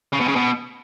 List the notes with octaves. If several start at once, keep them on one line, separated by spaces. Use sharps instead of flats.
C#3
B2
C#3
B2